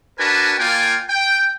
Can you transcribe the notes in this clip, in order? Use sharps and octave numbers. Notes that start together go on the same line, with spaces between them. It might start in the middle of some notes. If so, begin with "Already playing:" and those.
D4 F#4 A#4 B4 G#5 A5
A#3 F4 D5 G5 G#5
G5